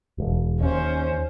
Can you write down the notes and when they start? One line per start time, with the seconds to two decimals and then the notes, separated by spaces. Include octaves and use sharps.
0.18 E1
0.61 D#2 C#4 C5